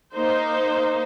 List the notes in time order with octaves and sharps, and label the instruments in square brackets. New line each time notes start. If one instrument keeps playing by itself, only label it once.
[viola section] A#3 D#4 C5